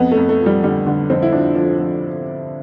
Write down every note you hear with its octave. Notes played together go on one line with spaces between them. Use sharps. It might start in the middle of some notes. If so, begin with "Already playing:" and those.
Already playing: F2 B3
A3
F2
A3
F3
G3
D3 G3
D3
F2 C4
E4
F3 D4
F3
F3